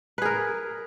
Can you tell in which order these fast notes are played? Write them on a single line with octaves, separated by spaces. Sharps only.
B4 G#4 A#4